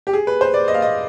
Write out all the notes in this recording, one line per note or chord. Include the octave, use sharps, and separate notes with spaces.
G4
G#4
B4
C5
D5
D#5
F5
D#5